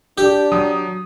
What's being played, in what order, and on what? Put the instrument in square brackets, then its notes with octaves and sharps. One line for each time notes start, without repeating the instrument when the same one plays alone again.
[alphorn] D4 [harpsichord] G4
[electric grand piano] F#3 [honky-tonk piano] D#6